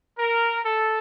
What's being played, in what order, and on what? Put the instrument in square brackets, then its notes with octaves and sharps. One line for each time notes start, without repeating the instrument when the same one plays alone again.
[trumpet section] A#4
A4